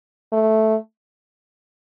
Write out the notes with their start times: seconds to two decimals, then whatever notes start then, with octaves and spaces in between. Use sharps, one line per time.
0.32 A3